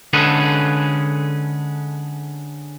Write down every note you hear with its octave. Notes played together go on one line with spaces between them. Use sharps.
D3 G#3 C#4 G#4 A4 B4